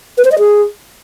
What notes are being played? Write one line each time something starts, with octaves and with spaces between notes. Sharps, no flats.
B4
C5
D#5
G#4